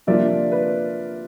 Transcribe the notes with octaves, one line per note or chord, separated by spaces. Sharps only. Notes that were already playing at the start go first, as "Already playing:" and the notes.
C3 F3 A#3 D4 F4 D5 E5
B4